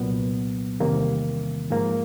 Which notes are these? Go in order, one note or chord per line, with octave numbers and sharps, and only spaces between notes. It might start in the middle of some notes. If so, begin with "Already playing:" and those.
Already playing: C2 A#2 F#3 B3
E2 C3 D#3 G3 A#3
G#2 F3 A#3